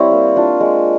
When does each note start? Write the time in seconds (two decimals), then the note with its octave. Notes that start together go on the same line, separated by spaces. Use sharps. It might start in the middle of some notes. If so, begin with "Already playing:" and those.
Already playing: G3 C4 E4 C#5
0.12 A#3
0.36 D4 F4
0.60 G#3